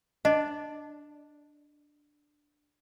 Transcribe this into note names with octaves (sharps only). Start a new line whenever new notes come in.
D4 D#5